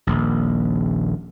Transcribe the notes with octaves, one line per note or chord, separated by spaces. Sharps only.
D#1 A#1